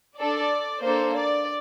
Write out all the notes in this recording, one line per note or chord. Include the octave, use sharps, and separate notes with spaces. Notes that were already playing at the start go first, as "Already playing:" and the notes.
D4 A4 D5
A#3 D4 A4 C5
D5